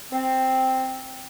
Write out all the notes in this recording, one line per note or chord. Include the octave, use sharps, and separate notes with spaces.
C4